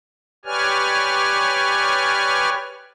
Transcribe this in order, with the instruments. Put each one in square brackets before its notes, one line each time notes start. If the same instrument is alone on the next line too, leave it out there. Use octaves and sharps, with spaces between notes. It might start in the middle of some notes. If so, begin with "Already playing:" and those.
[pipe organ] G4 B4 C#5 D5 G#5 F6